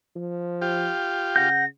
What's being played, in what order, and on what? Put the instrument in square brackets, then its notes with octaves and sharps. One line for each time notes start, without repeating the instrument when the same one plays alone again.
[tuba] F3
[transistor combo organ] F4 G4
[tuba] C#3 [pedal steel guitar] F#5 G6 [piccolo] A#6